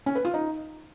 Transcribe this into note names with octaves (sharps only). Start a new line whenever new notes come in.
C#4
B4
F4
D#4